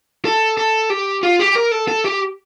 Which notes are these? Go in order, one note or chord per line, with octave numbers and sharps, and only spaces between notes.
A4
A4
G4
F4
G4
A#4
A4
A4
G4